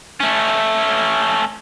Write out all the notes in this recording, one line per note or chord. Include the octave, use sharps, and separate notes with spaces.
A3 C#4